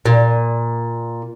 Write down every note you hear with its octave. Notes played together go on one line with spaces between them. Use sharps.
A#2